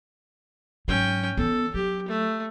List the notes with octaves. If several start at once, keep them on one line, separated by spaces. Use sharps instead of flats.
G#2 F#3 C#4 G5
E3 B3 A4
F#3 G4
A3